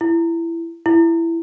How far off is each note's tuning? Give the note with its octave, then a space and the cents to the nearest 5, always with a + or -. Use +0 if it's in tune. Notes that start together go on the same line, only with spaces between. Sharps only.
E4 +20
E4 +15